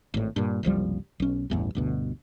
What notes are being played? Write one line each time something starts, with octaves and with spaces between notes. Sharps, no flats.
G#1 A2
G2 A#2
F#1 C2 F3 G3
B1 C#4
A1 E2 G2
G1 D2 B2